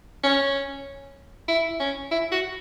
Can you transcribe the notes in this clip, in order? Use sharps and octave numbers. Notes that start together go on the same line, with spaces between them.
C#4
E4
C#4
E4
F#4